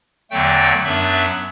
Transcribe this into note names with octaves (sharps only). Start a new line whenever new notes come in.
E2 D3 F#3 A3 G5
F#2 F#3 B3 D4 E5